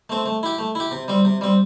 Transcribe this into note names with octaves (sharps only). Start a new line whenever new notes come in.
A3 C4
A3
E4 G4
A3
E4 G4
C3
G3 C4
C3
G3 C4